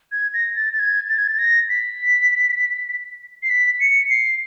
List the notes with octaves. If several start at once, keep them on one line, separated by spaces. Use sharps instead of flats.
G#6
A#6
A6
A6
G#6
A6
G#6
A6
A#6
B6
C7
B6
C#7
C7